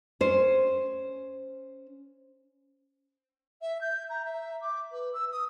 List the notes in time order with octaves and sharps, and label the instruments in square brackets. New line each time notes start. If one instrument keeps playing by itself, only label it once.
[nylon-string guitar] C#4 C5
[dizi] E5
G6
A#5
E5
D6
B4
E6
D#6